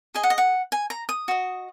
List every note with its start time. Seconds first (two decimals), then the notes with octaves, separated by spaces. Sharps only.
0.15 G#4 D#5 G#5
0.23 F#5
0.30 D#5
0.38 F#5
0.72 G#5
0.90 A#5
1.09 D#6
1.28 F#4 D#5